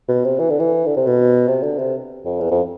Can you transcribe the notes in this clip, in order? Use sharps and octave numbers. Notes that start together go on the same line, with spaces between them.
B2
C3
E3
D3
E3
D3
C3
B2
C3
D3
C3
F2
E2
F2